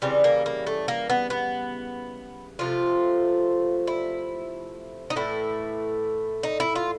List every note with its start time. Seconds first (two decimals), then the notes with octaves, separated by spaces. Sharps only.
0.02 C#3 E3 G3 C4
0.24 A#3
0.46 A#3
0.66 A3
0.88 A#3
1.10 B3
1.30 B3
2.59 C3 F3 A3 F4
3.87 E4
5.10 D#4
5.16 A2 E3 A3 E4
6.43 D#4
6.60 E4
6.75 F4